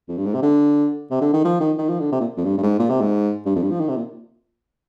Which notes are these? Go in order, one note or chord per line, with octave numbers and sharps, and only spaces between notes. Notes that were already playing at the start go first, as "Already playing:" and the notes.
F2
G2
G#2
C3
D3
C3
D3
D#3
F3
D#3
D#3
F3
D3
C3
A#2
F2
G2
G2
G#2
A#2
C3
G#2
G2
F2
G2
F3
D#3
C3
A#2